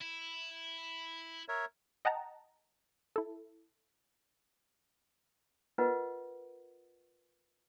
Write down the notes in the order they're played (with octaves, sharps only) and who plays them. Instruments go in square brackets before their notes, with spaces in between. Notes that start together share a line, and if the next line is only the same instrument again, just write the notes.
[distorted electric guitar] E4
[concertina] A#4 C#5 E5
[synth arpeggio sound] D#5 F#5 G5 A5 A#5
E4 A4
[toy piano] F4 A#4 B4 D#5 F#5